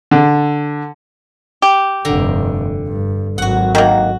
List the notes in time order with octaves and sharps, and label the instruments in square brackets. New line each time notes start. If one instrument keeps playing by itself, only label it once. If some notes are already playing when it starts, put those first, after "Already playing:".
[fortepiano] D3
[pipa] G4
[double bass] F1 G2 [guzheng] D3 A#5
[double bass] G2
[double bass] G#1 F#3 [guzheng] F#4 F#5
[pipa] D#3 A#3 [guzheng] F#4